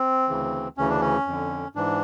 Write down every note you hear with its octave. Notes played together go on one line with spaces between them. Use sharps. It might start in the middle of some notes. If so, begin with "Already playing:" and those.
Already playing: C4
D2 C#3 E3
D2 C#3 E3 C#4
D4
C#4
F2 D3
G#2 E3 D4